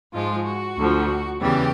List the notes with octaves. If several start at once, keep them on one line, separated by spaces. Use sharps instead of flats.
G#2 F3 G#3 F4
F#4
D2 D3 F3
E2 C#3 E3 G3 G4